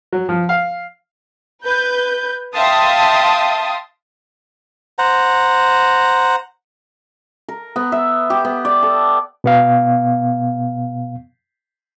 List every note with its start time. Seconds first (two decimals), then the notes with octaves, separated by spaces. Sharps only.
0.13 F#3
0.29 F3
0.49 F5
1.63 B4 G6
2.54 E5 F5 G5 A5 C6 D#6
4.98 C5 F#5 A#5
7.48 A#4
7.76 B3
7.92 E5
8.30 G4
8.45 B3
8.65 D5
8.83 A4
9.44 B2 B3 F5